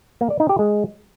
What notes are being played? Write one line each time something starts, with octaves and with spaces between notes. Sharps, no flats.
A#3
D5
D#4
G4
G#3